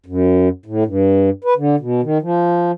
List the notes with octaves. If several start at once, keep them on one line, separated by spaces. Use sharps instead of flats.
F#2
A2
G2
B4
D3
B2
D#3
F3